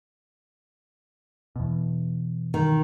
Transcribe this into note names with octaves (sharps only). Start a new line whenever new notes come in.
E2 B2
D#3